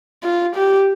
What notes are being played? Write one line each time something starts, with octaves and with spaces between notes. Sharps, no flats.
F4
G4